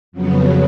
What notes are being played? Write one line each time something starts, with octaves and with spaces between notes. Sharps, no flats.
F2 C#3 F#3 B3